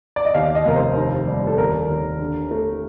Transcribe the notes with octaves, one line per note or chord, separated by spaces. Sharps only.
D5
D#5
D#2 F5
D#5
F1 A#4
C5
D#3
G3
A4
D#2 A#4
D#2
D3
A3